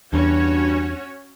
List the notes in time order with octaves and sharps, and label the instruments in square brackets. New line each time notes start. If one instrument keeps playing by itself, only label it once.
[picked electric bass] E2 [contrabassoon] G2 [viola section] C#4 F#4 C#5